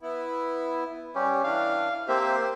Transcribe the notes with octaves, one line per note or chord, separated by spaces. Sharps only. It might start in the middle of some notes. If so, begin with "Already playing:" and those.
B3 E4
G3 C#4 G4
E3 D4 F5
A#3 C4 G4 C5 E5